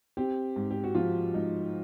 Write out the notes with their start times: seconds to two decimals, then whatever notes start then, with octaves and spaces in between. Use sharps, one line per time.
0.17 C4 G4
0.56 G#2
0.71 G4
0.84 F#4
0.95 F3 F4
1.34 G#2 D#4